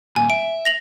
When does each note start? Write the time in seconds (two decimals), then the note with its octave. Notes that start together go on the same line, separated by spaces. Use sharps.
0.16 D#2 A#2 G#5
0.30 E5 D7
0.65 A#6 F7 F#7